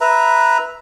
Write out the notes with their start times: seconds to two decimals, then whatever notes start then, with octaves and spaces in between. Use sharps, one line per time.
0.01 B4 E5 A#5